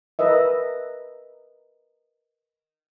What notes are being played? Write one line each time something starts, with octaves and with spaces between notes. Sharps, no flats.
A#4 B4 D#5 E5